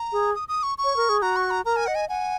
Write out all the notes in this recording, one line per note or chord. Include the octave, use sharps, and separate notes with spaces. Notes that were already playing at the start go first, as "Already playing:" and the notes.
Already playing: A#5
G#4
D#6
D#6
C#6
C#6
C#5
A#4
G#4
F#4 A#5
C#6
A#5
A#4 A#5
G#5
D#5 F#5
G#5
F#5 G#5